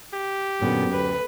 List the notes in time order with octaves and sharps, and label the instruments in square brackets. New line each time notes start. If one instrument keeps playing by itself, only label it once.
[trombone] G4
[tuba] F#2 [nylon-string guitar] A#2 D3 [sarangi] B3
[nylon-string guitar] D2 [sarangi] B4